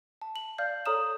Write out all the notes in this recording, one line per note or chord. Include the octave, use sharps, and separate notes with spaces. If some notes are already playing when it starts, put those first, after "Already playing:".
A5
F#7
D5 F5 F6 G6 C7
A4 C#5 A#5 D#6 F6 E7